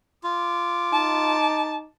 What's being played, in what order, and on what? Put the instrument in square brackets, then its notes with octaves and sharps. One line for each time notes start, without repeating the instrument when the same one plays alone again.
[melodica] F4 [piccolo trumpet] D6
[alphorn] D#4 [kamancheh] A5